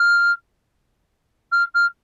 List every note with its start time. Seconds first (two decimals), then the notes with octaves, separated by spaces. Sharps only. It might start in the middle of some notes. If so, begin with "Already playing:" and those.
Already playing: F6
1.52 F6
1.74 F6